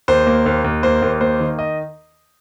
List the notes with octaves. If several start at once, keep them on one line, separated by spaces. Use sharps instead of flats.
D#2 C5
A#3
D#2
D#2
A#3 C5
D#2
A#3 C5
D#3
D#5